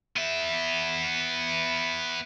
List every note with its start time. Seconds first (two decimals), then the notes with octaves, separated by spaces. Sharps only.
0.16 B3 E5